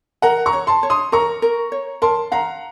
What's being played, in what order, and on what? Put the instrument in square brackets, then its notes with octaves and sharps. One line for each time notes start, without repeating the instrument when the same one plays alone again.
[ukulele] A#4 [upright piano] F#5 A#5
[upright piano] A#5 C#6
[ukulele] C#5
[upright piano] A5 C6
[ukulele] C#5
[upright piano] C6 D#6
[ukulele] A#4 [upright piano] A#5 C#6
[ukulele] A#4
C#5
[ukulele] A#4 [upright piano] A5 C6
[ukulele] F5 [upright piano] F#5 A#5